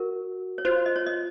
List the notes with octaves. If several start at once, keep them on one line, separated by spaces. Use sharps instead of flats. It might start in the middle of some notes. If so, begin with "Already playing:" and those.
Already playing: F#4 A#4
C#5
F4 C5
D#5
C#5
D#5